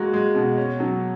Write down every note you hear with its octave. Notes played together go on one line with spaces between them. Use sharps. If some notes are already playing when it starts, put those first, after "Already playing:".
Already playing: G#3 A#3 F#4
G#3
B2
C#4
F#3